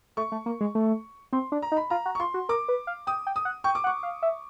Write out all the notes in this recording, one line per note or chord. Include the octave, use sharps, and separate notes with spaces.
A3 C#6
A3
A#3
G#3
A3
C4 C6
D4
A#5
D#4
B5
F4 A#5
F#4
C#6
F4 C6
F#4
A#4 D6
B4
F5
G5 D#6
G5
D#6
F#5
G5 C#6
D6
F#5
C#6
F5
E5